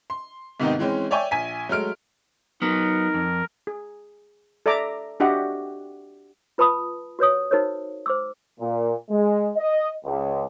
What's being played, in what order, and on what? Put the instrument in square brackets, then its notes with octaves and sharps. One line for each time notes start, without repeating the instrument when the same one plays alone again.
[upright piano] C6
G#2 C3 D#3 B3 C4 D#4
E3 G#3 C4 C#4
C#5 D5 E5 G5 G#5 C#6
A#1 G#5 B6
F#3 G#3 A3 F6 D7
[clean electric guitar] F#3 B3 [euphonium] D#4 [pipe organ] A#4
[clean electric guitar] F2
[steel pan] G#4
A4 D5 E5 A#5 D6
D4 F#4 G4 D#5 E5 F#5
[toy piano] F4 B4 A5 B5 D#6
F#4 B4 C#5 D#6
D#4 F#4 A#4 C5 C#5
C5 D6 E6
[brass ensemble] A#2
G#3
D#5
C#2